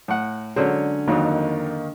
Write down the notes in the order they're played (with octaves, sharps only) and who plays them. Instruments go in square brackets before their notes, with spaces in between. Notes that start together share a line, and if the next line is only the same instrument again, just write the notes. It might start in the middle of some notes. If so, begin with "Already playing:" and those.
[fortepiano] A2 F#5
[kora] D3 G#3 C5 [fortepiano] F#3 C#4
[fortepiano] F2 F#3 D#4 [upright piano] D#3 A#3